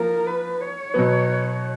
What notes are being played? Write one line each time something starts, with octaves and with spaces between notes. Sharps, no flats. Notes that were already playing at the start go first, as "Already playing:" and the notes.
Already playing: F3 A#3 A#4
B4
C#5
B2 F#3 B3